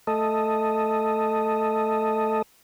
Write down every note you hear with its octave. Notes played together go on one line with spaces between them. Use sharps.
A3 A4 D#5